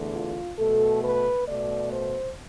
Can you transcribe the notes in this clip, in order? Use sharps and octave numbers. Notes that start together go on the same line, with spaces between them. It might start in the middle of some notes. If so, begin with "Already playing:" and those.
Already playing: E2 D3 A3
F4
B2 A3 A4
B4
B2 A3 D5
C5